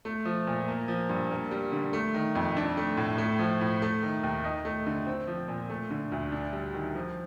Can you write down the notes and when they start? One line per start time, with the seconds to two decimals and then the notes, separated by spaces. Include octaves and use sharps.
0.05 A3
0.25 F3
0.47 A#2
0.68 A#3
0.88 F3
1.09 G2
1.31 A#3
1.51 G3
1.72 D3
1.93 A3
2.14 D#3
2.35 F2
2.57 D4
2.77 A3
2.97 A2
3.18 A3
3.39 F3
3.61 A2
3.82 A3
4.03 D#3
4.23 D#2
4.44 D#4
4.65 A3
4.87 D3
5.07 C4
5.27 F3
5.48 A#2
5.70 A3
5.91 D3
6.12 D2
6.32 D4
6.53 G3
6.74 D#3
6.95 F3